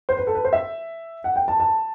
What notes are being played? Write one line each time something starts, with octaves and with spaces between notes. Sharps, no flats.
C5
B4
A4
B4
C5
E5
F#5
G5
A5
A5